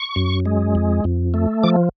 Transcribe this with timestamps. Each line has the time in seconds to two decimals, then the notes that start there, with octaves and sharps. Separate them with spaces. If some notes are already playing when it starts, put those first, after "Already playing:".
Already playing: C#6
0.16 F#2
0.45 G#3
0.75 F2
1.04 F2
1.34 A3
1.63 F3 D6